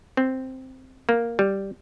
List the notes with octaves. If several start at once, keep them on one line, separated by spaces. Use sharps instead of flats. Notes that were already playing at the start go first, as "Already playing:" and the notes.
C4
A#3
G3